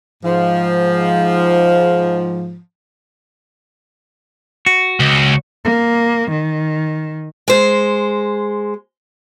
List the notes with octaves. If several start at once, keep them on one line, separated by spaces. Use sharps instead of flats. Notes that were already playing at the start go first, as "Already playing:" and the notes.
G#2 F3
F#4
C#2
A#3
D#3
G#3 C5